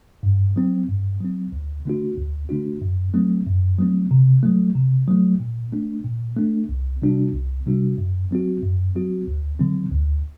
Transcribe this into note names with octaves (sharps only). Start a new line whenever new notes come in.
G2
F#3 C4
G2
F#3 C4
D2
D3 A3 D4 F#4
D2
D3 A3 D4 F#4
F#2
F#3 A3 C4
F#2
F#3 A3 C4
C3
F#3 A3
C3
F#3 A3
A#2
A3 D4
A#2
A3 D4
C2
C3 G3 D4 F#4
C2
C3 G3 D4 F#4
F#2
F#3 C4 F#4
F#2
F#3 C4 F#4
D2
D3 F#3 C4
D2